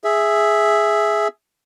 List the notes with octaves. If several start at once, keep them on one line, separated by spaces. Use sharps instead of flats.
G#4 E5